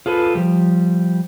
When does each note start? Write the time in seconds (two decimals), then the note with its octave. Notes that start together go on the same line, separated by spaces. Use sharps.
0.06 F4 G#4 A4 B4
0.35 F3 G3